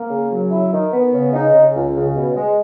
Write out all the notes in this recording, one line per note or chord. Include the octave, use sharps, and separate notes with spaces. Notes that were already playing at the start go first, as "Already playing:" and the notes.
Already playing: A#3
C#3
F#3
E4
D#3
B3
C#3
D#4
C#3
C#2
C#3
B2
G#3